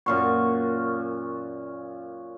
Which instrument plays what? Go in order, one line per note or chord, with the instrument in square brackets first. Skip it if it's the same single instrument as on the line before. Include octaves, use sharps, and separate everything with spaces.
[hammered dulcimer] F#2 A#2 C#6